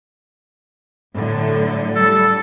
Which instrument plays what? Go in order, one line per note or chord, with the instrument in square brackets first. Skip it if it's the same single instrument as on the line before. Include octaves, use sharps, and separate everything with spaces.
[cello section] A2 D3 F#3
[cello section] G3 [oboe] A4